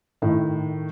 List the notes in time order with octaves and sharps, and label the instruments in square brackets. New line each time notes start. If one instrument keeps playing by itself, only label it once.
[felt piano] A2 D#3